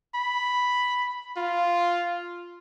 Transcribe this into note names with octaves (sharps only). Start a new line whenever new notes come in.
B5
F4